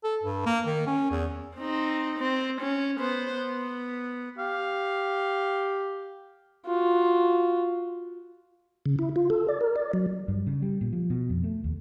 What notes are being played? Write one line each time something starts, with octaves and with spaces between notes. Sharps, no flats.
A4
G2
A#3
D#3
C#4
E2
C4 D#4
C4
C#4
B3 C5
B3
G4 F5
F4 F#4
C#3
E4
F4
A4
D5
A#4
D5
F#3
G2
C#3
G3
A#2
F3
B2
F2
A3
D#2